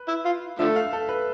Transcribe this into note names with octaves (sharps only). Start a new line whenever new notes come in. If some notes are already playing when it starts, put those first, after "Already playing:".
Already playing: B4
E4
F4
D3 F3 A3 E5
F5
A4
B4